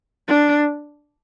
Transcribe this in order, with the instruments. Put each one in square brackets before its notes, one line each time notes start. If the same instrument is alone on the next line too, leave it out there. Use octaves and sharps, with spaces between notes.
[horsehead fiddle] D4